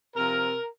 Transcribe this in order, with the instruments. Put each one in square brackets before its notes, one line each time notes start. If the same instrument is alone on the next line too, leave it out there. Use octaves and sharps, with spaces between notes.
[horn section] C3 F3 A#4